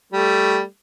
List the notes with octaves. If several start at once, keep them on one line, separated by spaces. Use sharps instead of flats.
G3 A3